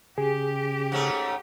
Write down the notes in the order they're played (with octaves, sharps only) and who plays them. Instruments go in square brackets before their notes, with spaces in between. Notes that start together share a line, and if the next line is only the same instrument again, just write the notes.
[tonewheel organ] C#3 [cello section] G4 [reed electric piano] G#4
[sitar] G#2 A3 C#4